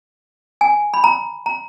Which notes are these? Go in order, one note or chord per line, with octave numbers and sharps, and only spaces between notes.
G#5
B5
A#5
A#5